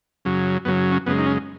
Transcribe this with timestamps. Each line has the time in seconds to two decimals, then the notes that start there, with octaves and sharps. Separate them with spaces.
0.25 F#2 C#3 F#3
0.65 F#2 C#3 F#3 B3
0.92 C#4
1.06 F#2 C#3 G#3 B3
1.18 D#4
1.26 C#4